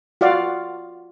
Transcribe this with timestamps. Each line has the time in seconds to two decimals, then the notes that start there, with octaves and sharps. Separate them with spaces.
0.21 F4 F#4 D5 F5